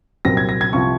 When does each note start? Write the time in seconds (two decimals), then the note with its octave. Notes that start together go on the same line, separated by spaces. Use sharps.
0.25 C2 A#2 F#3 C4 A#6
0.37 G#6
0.49 A#6
0.61 G#6
0.73 C2 C3 F3 C#6